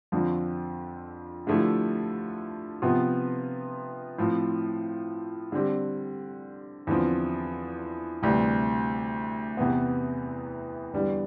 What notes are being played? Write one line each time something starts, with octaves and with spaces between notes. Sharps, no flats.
F2 D3 F3 C4
D3 F3 A3 E4 G4
C3 F3 B3 F4
A2 F3 C4
D3 G3 C4 G4
E2 D3 F3 C4
D2 C3 E3 G3
E2 C3 E3 B3
E2 D3 G3